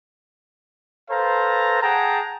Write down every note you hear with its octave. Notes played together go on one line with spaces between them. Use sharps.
A4 B4 C5 F5 A#5
G#4 F#5 G5 A5 A#5